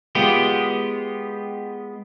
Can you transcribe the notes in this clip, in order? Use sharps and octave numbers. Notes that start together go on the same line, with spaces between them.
G#3 B3 F4 G4